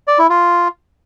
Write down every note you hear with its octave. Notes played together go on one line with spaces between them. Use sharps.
D5
E4
F4